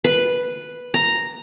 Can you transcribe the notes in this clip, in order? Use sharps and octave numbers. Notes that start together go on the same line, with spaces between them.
B4
A#5